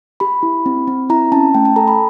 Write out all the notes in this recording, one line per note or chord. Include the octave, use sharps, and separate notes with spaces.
G4 B5
E4
C4
C4
E4 A#5
C#4 A5
A3 G5
A5
A4 A#5
B5